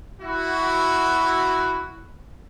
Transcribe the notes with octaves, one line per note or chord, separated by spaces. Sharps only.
E4 F#4